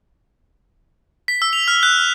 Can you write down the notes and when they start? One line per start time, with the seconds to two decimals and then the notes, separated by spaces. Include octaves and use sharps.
1.28 B6
1.42 E6
1.53 F7
1.68 F6
1.83 F#6
1.99 F6